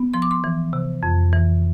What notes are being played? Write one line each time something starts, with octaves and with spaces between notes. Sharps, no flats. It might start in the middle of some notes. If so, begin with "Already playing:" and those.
Already playing: B3
F3 C6
D6
C6
E3
C3
F2
E3